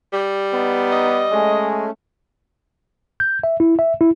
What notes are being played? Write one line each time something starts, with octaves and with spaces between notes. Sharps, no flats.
G3
B3 D#4
D#5
G#3 A3 C#4
G6
E5
E4
E5
E4